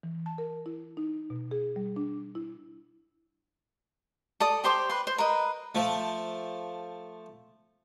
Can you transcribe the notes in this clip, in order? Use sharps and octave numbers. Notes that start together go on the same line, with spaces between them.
E3
A5
A#4
E4
D#4
B2
G#4
G3
D4
E4
A4 D5 D#6
G4 C5 C6 D6
B4 C6
C5
A#4 B4 D#5
F3 A3